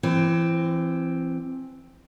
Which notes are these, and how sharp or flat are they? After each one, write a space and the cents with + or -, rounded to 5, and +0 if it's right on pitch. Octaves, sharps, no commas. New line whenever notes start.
E3 +30 C4 +5